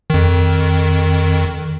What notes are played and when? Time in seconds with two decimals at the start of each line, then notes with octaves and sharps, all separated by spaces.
0.10 F2 D#3